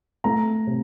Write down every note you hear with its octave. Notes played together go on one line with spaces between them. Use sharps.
A3 A#5
C3